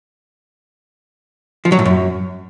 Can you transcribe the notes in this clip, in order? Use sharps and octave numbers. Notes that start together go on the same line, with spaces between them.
F3
F#3
A2
F#2